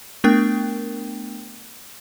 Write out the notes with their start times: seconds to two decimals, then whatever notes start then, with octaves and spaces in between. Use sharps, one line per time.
0.24 A3 B3 D4 A#4 G5